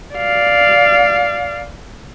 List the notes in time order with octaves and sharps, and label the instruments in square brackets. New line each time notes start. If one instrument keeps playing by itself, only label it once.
[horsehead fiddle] D5 F5